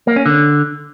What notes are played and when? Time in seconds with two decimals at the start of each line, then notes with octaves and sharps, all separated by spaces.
0.07 A#3
0.16 C#4
0.26 D3